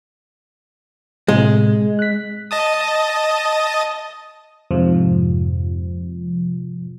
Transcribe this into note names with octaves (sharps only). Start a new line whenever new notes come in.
A2 C3 G#3
F#6 B6
D#5 A5 D#6
F2 G#2 C3 F3